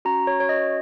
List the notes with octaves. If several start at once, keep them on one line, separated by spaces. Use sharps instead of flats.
C#4 F#4 A#5
C#5
C#5
D#5